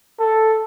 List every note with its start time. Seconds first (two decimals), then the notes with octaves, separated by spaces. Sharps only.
0.20 A4